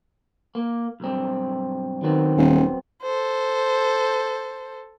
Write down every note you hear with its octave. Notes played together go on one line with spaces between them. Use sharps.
A#3
B1 G2 C4
D#3 F#3 B3 C4
D#1
A4 C5